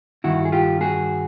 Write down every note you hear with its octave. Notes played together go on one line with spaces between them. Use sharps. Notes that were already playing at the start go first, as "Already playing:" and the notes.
G2 D#3 E4 F#4
G#4
F4 G4
F#4 G#4